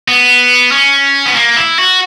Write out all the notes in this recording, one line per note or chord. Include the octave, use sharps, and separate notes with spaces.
B3
C#4
B3
A#3
E4
F#4